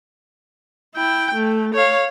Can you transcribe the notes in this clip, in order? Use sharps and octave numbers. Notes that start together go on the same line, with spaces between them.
E4 G5
A3
C#5 F5